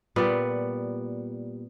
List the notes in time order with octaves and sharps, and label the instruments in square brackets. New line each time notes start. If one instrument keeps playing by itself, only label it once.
[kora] A#2 G3 B3